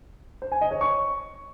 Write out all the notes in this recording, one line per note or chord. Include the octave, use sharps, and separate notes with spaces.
C5
G#5
D#5
C#5
C#6